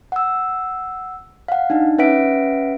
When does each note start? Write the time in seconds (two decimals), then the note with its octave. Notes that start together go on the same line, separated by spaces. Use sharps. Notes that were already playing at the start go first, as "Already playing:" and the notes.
0.12 F#5 E6
1.48 F5 F#5
1.70 D4 D#4
1.98 C#4 B4 E5 F#5 B6 D7